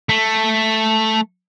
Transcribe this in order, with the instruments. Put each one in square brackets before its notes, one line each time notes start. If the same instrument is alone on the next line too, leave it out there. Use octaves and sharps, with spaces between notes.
[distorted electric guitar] A3